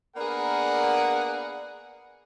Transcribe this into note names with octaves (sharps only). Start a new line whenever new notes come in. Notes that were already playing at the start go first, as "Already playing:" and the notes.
A#3 B3 D4 G#4 A#4 F#5